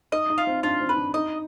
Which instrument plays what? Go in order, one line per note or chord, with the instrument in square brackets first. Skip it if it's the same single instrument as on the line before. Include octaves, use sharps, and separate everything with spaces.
[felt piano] D#4 [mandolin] D#5
[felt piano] D#4
[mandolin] F4
[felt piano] C4
[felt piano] D4 [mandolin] F4
[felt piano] C4
[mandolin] B4
[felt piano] D4
[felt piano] D#4 [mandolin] D#5